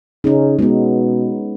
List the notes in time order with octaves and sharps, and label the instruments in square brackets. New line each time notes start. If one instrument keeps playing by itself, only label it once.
[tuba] C#3 [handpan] C#4 D#4
[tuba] B2 [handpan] G#3 B3